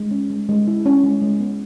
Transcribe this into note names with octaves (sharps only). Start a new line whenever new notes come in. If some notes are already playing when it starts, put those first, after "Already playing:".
Already playing: G#3
C#4
G#3
G#3
E4
C#4
G#3
G#3
B3